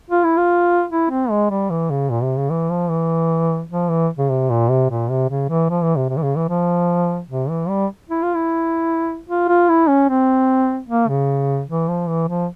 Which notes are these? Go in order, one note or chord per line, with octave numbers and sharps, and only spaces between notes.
F4
E4
F4
E4
C4
G#3
G3
E3
C#3
A#2
C3
C#3
E3
F3
E3
F3
E3
C#3
C3
A#2
C3
A#2
C3
C#3
E3
F3
E3
C3
C3
E3
C#3
E3
F3
C3
E3
G3
E4
F4
E4
F4
F4
E4
C#4
C4
A#3
C#3
E3
F3
E3
F3